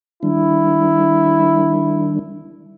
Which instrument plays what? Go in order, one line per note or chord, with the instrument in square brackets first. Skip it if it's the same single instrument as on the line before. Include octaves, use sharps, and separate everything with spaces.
[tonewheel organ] D#3 G3 D4 [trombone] E4